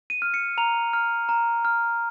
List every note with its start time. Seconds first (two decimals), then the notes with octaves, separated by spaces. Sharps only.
0.10 D#7
0.22 F6
0.34 C#7
0.58 A#5 F7
0.93 F6
1.29 A#5
1.65 F6